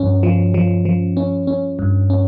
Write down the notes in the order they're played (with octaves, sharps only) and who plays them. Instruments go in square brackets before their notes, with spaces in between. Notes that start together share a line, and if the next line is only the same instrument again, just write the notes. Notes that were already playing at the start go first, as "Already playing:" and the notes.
Already playing: [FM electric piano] G2 F3 C#4
F3
F3
F3
C#4
C#4
G2
C#4